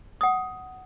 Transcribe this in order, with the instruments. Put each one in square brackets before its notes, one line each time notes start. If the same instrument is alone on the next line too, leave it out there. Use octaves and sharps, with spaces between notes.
[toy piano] F#5 D#6